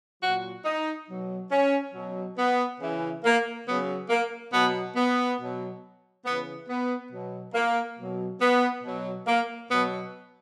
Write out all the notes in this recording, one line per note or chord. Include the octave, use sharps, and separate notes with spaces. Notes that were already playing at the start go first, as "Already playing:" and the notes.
A#2 F#3 F#4
D#4
B2 F#3
C#4
B2 F#3
B3
C#3 E3
A#3
C#3 F#3 B3
A#3
B2 F#3 B3
B3
B2 F#3
C#3 E3 B3
B3
B2 F#3
A#3
B2 F#3
B3
B2 F#3
A#3
B2 F#3 B3